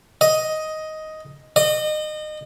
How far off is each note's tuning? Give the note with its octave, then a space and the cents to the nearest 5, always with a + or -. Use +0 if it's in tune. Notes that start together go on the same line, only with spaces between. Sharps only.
D#5 +5
D#5 -30